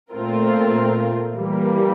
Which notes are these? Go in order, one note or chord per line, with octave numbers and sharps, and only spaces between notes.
A#2 A3 C4 F4 A#4
E3 G3 A#3